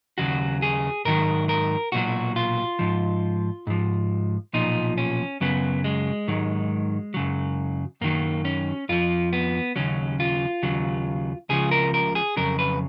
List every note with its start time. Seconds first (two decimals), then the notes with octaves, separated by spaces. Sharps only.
0.18 D#2 C#3 F#3 F#4
0.62 G#4
1.05 G#2 D#3 F#3 A#4
1.49 A#4
1.92 B1 A#2 F#3 F#4
2.36 F4
2.79 G#2 F3
3.67 G#2 F3
4.53 B1 A#2 F3 D#4
4.98 C#4
5.41 F#2 C#3 F#3 B3
5.84 G#3
6.28 G#2 D#3 F#3
7.14 F#2 C#3 F#3
8.01 F#2 D#3 F#3 A#3
8.45 C#4
8.89 F2 F3 F4
9.33 B3
9.76 D#2 C#3 F#3 C#4
10.20 F4
10.63 D#2 C#3 F#3
11.49 C#2 C#3 F3 G#4
11.71 A#4
11.94 A#4
12.15 G#4
12.37 F2 C#3 F#3 A#4
12.59 B4